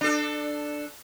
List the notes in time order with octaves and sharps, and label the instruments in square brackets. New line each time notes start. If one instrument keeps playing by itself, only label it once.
[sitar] D4 A4